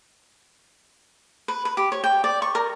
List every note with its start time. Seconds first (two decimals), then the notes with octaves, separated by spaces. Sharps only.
1.48 B4
1.65 B4
1.77 G4
1.92 C#5
2.04 G5
2.24 D5
2.42 C#6
2.55 A#4